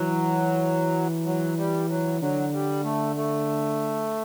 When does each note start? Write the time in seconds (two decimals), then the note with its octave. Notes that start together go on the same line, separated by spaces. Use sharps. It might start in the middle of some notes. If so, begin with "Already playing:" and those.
Already playing: E3 F#3
1.26 F#3
1.58 G3
1.89 F#3
2.21 D3 F#3
2.53 G3
2.84 A3
3.16 A3